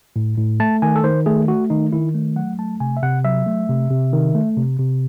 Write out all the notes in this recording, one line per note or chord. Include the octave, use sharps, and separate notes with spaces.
A2
A2
A3 A5
D#3 G#5
A4
D#3 C5
A3 G#4
A3 F#4
D#3 D#4
D#3 E4
A3
F#3 F#5
A3 A5
C3 G#5
E5
C3 F#5
F#3 E5
A3
C3
C3
D#3
A3
C3
C3